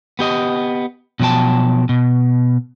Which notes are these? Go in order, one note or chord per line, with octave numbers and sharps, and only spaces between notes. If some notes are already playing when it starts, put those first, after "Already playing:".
B3 G4 D#5
B2 F3 F#3 G5 A5
B2